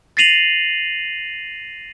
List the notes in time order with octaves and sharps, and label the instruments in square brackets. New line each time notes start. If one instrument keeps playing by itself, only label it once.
[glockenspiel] A6 A#6 C7 D#7 F7 F#7